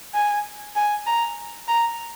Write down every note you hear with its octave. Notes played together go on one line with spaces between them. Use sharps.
G#5
G#5
A#5
A#5